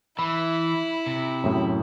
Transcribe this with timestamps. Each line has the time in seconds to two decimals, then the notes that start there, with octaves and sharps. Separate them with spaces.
0.19 E3 E4 B5
1.07 C3
1.44 F#2 A2